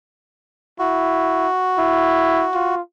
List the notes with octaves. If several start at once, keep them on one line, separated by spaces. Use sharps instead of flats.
E4 F#4
E4
F4